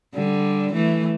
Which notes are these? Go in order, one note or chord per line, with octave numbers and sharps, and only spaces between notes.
D3 G3
E3 A3